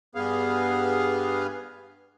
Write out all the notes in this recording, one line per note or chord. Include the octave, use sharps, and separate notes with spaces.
G2 B3 G#4 F5